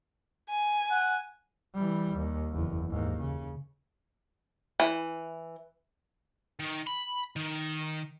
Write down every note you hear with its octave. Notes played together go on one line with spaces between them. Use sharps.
G#5
F#5
E3 G3
D#2
F#1 E2
D#2 G#2
C#3
E3
D#3
B5
D#3